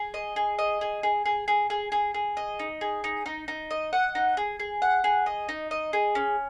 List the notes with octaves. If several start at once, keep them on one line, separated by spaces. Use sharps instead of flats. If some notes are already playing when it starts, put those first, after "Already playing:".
Already playing: G#4
D#5
G#4
D#5
G#4
G#4
G#4
G#4
G#4
G#4
G#4
D#5
D#4
G#4
D#4
D#4
D#4
D#5
F#5
D#4
G#4
G#4
F#5
G#4
D#5
D#4
D#5
G#4
C#4